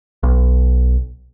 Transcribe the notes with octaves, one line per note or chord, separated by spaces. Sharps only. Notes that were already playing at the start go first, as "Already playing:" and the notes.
B1